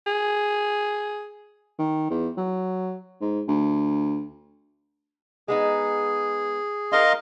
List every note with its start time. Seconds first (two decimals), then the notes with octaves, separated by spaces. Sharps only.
0.07 G#4
1.79 D#3
2.10 E2
2.37 F#3
3.21 G#2
3.48 D2
5.48 G#3 B3 D#4 G#4
6.92 D#4 A#4 D#5 F5 C6